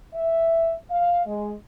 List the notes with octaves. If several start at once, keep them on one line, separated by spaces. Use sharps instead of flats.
E5
F5
G#3